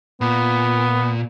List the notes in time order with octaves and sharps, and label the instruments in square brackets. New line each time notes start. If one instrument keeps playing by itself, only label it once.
[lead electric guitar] A#2 [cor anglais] B3